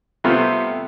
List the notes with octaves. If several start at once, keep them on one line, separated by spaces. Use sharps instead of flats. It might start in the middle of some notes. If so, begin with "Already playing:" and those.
C3 G3 A3 B3 C4 F4